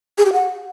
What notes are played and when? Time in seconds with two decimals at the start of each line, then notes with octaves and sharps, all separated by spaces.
0.18 G#4
0.25 G4
0.33 F#5